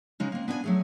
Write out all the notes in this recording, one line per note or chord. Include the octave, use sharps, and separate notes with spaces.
C#3 G#3 D#4
A#3 C4
B3 D4 D5 D#5 G#5
F#3 A3 G#4